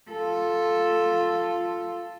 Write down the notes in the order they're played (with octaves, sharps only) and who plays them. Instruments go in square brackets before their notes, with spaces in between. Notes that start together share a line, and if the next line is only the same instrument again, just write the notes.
[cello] F4 A4